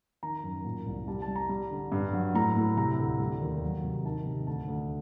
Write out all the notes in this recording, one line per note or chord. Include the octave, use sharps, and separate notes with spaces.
D#3 A#5
F#2
A#2
C2
G3 A5
A5
G3
A#5
G3
D3
G2
F#3
A2 A#5
A2
C3 A#5
D2
G3
D#2
F#3
C3
D#3 A5
C3
D2 A5
D2